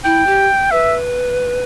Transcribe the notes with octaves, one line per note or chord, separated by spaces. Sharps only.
E4 G5
G4
B4 E5